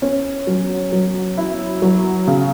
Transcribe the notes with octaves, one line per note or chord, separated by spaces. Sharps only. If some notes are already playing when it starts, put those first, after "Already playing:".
C#4
F#3
F#3
E4
F#3
C#3